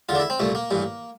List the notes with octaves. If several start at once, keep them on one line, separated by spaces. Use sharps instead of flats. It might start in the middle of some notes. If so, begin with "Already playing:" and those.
E2 D3 F4
D4
E4
C4
C2 A#2 A3
A#3
A1 G2 E3